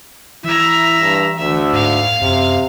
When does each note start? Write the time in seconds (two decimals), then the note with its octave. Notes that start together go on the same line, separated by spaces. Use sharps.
0.44 E3 E4 E5 A#5
1.00 G2
1.38 D2 E5
1.73 G#2 F5
2.21 F#2 C3